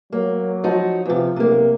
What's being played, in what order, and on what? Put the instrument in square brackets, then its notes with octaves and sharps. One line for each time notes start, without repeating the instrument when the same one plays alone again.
[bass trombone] F#3 [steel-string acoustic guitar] A#3
[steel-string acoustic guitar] F3 D#4 F#4
[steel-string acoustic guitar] E2 C3 [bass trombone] F3
[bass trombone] B1 [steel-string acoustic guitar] C3 A#3